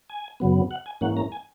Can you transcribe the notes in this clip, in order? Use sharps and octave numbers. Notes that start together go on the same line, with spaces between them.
G#5
F#2 C#3 F#3 B3
F#5
G#5
G#2 E3 A#3 C#4 F#5
A#5
G#5